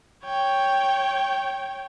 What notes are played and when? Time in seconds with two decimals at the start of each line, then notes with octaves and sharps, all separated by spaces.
0.24 C#5 G5